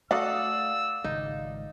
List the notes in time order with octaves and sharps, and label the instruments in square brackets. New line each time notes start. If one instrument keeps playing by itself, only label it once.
[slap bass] A3 [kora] F#4 A4 [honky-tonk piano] D5 F5 D#6 [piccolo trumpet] E6
[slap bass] G#1 C#3 G#3 [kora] D#4